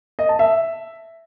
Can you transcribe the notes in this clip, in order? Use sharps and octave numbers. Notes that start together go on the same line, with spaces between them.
D#5
A5
E5